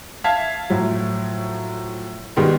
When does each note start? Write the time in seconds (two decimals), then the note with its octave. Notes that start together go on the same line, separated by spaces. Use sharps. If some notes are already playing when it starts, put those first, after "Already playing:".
0.24 E5 F5 A5 G#6 B6
0.70 A2 F3 F#3
2.36 B2 D#3 G3 G#3